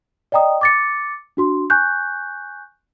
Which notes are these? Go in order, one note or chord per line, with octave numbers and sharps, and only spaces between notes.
D5 D#5 G5 A#5 D#6
D6 A6 C#7
D4 F#4 C6
G#5 C#6 F#6 G6